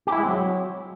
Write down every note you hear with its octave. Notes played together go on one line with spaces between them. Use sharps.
G4
E4
G#3
C4
F#3